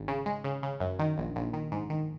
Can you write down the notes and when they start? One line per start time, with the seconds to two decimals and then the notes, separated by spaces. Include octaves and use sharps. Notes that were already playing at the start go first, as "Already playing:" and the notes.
Already playing: G#1
0.08 C#3
0.26 G#3
0.44 C#3
0.63 C#3
0.80 F#2
0.99 D#3
1.18 A#1
1.36 A#1
1.53 D#3
1.72 G#2
1.90 D#3